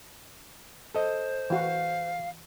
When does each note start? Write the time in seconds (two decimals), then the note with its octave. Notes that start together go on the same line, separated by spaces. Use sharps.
0.94 A4 C5 D#5
1.50 E3 F#4 F5